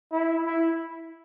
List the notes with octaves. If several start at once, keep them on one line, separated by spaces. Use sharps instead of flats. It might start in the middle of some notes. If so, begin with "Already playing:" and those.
E4
E4